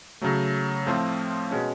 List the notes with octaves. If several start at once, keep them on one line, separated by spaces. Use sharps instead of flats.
C#3 F#3 A3
A2 F3 A3 C4 F4
B2 G#3 C#4